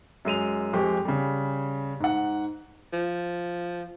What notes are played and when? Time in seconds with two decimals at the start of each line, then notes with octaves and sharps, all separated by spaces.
0.25 F#2 G#3 D#7 F7
0.73 F2 G#3 C4 G4 C#6
1.05 C#3 G3
2.00 G#2 F#5
2.93 F3